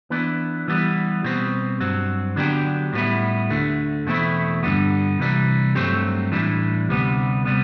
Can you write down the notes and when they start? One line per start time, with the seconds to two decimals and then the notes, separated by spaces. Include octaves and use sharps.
0.10 E3 B3 D4
0.68 E3 G3 B3
1.24 B2 G3 C4
1.80 G2 F#3 C4
2.36 D3 F#3 B3 D4 G4
2.93 A2 G3 B3 E4
3.50 D2 D3 A3
4.06 E2 B2 A3 C4 E4
4.63 G2 D3 G3 B3
5.19 C2 C3 E3 G3
5.75 G2 F#3 A3 C4 G4
6.32 A2 E3 G3 D4
6.88 D2 C3 G3 B3
7.45 C3 G3 B3